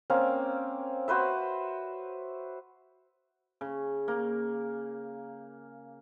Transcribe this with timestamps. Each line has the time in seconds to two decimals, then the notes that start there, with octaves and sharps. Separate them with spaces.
0.10 A#3 C4 C#4
1.08 F#4 B4 C5 E5
3.61 C#3
4.08 A#3